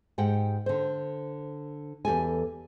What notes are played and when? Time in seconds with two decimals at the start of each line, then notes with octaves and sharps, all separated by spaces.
0.18 G#2 G4 F#5 G5
0.66 D3 C5
2.05 E2 G4 A4 G#5